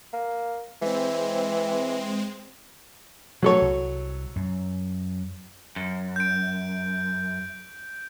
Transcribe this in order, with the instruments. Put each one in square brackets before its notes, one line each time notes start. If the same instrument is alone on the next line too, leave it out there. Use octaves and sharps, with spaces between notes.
[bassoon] A#3
[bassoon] E3 [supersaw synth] G#3 C4
[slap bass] C3 A3 [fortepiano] F#3 A4 C#5
[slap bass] C2
F#2
[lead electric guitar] F#2
[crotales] G6 D7